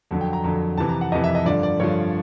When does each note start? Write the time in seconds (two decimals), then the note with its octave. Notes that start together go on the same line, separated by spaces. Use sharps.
0.11 F2 D3 F#3
0.21 G5
0.33 A#5
0.44 F2 D3 F#3 A#5
0.78 F2 C3 E3 A5
0.89 A#5
1.01 F#5
1.12 F2 C3 E3 D#5
1.24 E5
1.35 D#5
1.46 G2 D3 F3 D5
1.63 D5
1.80 G2 D3 F3 C#5